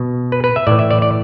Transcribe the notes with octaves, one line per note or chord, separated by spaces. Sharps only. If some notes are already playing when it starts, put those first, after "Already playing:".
Already playing: B2
B4
B4
E5
A2 E3 D5
E5
D5
D5